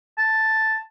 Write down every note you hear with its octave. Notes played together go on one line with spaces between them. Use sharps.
A5